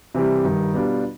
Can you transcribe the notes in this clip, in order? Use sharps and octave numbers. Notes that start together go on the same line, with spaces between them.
C3 E3 G3
G2 D#3 G3
B2 G3 B3 D4 F4